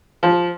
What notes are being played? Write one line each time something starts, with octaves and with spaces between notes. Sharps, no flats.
F3